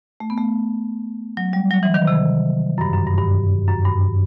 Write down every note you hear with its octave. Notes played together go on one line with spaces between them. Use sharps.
A3
B3
A3
F#3
G3
F#3
E3
D#3
C3
F#2
G2
F#2
G2
G2
F#2
G2